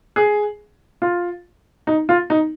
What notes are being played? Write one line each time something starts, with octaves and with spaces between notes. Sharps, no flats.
G#4
F4
D#4
F4
D#4